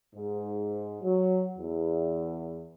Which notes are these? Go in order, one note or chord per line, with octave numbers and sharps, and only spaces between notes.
G#2
F#3
E2